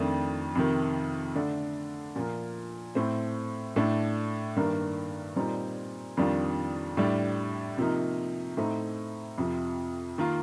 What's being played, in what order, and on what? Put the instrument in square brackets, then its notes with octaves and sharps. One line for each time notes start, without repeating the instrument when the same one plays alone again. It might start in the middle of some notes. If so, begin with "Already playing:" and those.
Already playing: [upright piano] F2 D#3 A3 D4
F2 C3 D#3
D3 A3 D4
A#2 F3 A#3
A2 A3 C4
A2 A3 D4
G2 D#3 A#3 D4
A#2 G3 C4 D#4
F2 D#3 G3 D4 F4
A2 G3 D4
C3 F3 A#3 D#4
A2 A3 C4 D#4
F2 C3 F3
D#3 A#3 F4